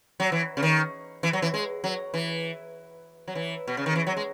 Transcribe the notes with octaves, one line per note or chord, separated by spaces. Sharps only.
F#3
E3
C#3
D#3
E3
F#3
E3
G#3
F#3
E3
F#3
E3
B2
C#3
D#3
E3
F#3
G#3